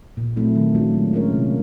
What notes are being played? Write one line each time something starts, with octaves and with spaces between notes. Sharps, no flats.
A#2
F#3 A3 C4 E4
D#3
F#3 A#3 D4 F4
G#3
C#4 F4 A#4 C#5
C3